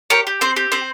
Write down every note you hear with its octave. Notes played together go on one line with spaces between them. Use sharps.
G4 A#4 C#5
G4
C4 C5
G4
C4 C5